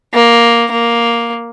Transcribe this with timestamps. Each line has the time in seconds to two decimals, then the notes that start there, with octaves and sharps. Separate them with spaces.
0.14 A#3
0.71 A#3